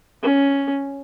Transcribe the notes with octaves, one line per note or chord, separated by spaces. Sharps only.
C#4